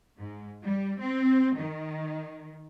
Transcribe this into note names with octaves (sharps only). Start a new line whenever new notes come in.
G#2
G3
C4
D#3